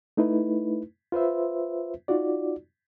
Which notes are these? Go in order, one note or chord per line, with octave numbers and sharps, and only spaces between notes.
A3 D#4 E4 B4
F4 B4 C5 E5
D#4 F4 F#4 D5